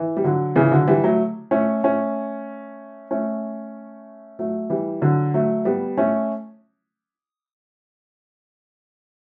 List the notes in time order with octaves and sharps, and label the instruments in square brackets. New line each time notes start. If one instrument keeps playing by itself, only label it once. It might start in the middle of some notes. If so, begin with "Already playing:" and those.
Already playing: [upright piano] E3
G3
D3 F#3
C#3 E3
D3 F#3
E3 G3
F#3 A3
A3 C#4
A3 C#4
A3 C#4
F#3 A3
E3 G3
D3 F#3
F#3 A3
G3 B3
A3 C#4